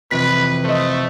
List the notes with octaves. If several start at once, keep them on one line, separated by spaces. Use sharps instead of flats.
F2 C3 E3 B4 B6
A3 C5 D#5